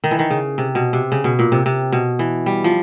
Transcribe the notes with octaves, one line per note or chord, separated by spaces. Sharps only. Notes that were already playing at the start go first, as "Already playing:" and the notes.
D#3
E3
D#3
C#3
C3
B2
C3
C#3
B2
A#2
C3
C3
B2
E3
G3
F3